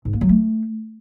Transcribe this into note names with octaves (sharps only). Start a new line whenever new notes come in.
G#2
A#3
F#3
A3